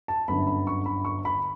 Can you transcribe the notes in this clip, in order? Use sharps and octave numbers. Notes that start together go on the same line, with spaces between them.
A5
G1 F#2 D3 B5
B5
C#6
B5
C#6
B5